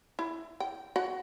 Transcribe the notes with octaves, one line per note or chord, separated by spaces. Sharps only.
E4
G5
F#4 F#5